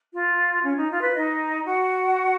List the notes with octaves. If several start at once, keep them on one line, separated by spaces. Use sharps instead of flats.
F4
C#4
D#4
F4
B4
D#4 D#5
F#4 F#5